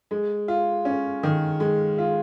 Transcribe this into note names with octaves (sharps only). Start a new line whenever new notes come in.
G#3
F4
C#4
D#3
G#3
F4